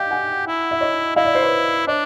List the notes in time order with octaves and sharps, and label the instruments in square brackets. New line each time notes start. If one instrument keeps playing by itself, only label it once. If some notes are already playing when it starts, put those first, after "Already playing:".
Already playing: [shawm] G4 [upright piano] D#5 F5 G5
[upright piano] F#5 G#5
[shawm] E4
[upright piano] E5
C#5 D#5
[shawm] E4 [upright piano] D#5 F5
[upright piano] D5 E5
C5 D5
B4 C#5
[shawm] D4 [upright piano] C#5 D#5